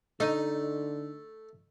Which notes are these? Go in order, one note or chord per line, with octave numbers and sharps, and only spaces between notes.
D3 A3 D#4